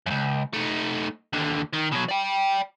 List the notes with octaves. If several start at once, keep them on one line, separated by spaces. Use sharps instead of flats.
C#2 F#2
A3 D#4
D#2 D3
D#3
B2 F#3
D5 G5